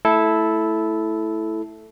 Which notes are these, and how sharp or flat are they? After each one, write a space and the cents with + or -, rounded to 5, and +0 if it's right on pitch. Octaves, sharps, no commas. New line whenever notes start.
A3 +5 E4 +0 A4 -10